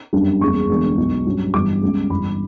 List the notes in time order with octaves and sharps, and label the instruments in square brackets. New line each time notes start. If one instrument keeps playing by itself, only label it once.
[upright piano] G1 F#2 D3 G3 D4
F#1 E2 C#3 G3 C#6
E1 E2 D3
B1 B2 F#3
G2 F#3 C#4
G1 G2 E3 G3 B3 D6
C#2 C#3 G3 C#4
G1 G2 E3 B5